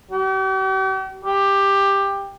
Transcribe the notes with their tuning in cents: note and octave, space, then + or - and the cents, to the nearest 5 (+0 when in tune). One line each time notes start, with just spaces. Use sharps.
G4 -45
G4 +10